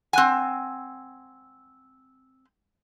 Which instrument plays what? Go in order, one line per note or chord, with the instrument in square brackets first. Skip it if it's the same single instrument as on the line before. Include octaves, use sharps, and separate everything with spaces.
[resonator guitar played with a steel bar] C4 G#5 [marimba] F#5 F#6